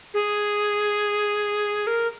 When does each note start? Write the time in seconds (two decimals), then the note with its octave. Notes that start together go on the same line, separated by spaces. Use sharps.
0.14 G#4
1.87 A#4